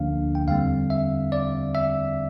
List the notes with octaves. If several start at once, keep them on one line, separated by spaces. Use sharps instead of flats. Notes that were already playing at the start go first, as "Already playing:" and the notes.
Already playing: D2 D3 F3 A#3 D4 F5
G5
E2 D3 G3 C4 F5
E5
D5
E5